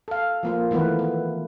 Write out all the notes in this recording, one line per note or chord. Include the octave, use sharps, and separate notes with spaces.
A4 F5
F3 A#3 F4
D#3 E3 A3 B3 B4
B3